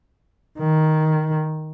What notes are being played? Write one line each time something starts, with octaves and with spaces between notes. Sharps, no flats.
D#3